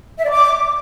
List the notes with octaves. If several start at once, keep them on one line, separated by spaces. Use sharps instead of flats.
E5
D5
D6